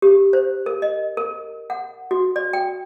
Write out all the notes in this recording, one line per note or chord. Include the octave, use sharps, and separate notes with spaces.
G4
C5
A#4
D#5
A#4
F#5
F#4
D5
G5